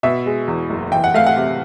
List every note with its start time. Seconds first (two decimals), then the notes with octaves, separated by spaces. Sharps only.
0.03 B2 E5
0.26 G#3
0.48 E2
0.70 F#1
0.92 E3 G5
1.04 F#5
1.14 A3 F5
1.27 F#5
1.36 C3